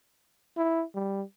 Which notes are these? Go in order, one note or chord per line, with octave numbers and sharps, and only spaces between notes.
E4
G3